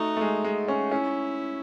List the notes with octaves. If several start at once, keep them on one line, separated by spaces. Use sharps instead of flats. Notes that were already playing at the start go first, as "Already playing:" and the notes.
Already playing: A3 D#4 F#4
A3
G#3
G#3
C#4
C#4 E4